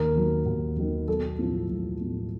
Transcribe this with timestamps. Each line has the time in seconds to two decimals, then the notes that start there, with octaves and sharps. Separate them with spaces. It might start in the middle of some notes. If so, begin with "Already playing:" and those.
Already playing: D#2 A#4
0.15 D#3 F#3
0.46 D#2
0.77 D#3 F#3
1.08 B1 A4
1.39 A2 F3
1.69 B1
2.01 A2 F3